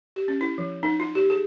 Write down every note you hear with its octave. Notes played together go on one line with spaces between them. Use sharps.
G4
C#4
E4
F3
D#4
F4
G4
G#4